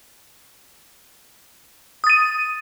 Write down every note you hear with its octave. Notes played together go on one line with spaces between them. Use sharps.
D#6 A6 D#7